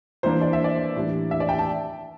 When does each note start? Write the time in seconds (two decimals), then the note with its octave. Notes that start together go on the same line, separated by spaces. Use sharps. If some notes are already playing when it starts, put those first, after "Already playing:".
0.23 E3 A#3 D4 C5
0.41 D5
0.53 E5
0.64 D5
0.96 A2 E3 G3 D4
1.31 E5
1.40 D5
1.49 G5
1.59 A5